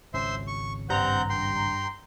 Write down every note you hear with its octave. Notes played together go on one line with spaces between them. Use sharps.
G#1 C#2 C#4 C5 E5 C6
C#6
G2 C4 F#5 A#5 G6
G5 C6